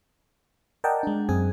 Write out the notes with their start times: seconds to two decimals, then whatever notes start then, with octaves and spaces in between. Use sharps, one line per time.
0.84 A#4 D5 D#5 F#5 G5 A5
1.03 G#3 D4
1.29 F#2 C4 G#4 G#5